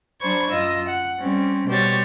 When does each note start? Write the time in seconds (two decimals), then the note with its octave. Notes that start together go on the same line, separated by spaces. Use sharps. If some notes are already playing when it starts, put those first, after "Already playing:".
0.21 F#3 D4 C5 B5 C#6 G#6
0.50 F#2 F4 D#5 E6
0.89 F#5
1.21 G3 C4 C#4
1.68 B2 G3 G4 C5 C#5 A6